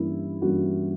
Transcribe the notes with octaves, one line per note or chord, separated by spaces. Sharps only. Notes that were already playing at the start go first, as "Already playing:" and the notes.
Already playing: G2 E3 G3 A#3 C#4 E4
G2 E3 G3 A#3 C#4 F#4